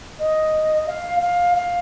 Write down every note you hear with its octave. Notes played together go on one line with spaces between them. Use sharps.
D#5
F5
F5
F5